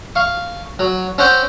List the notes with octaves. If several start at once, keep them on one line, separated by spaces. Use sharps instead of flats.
F5 C#6
F#3
C4 C#4 C#5 F#5 G5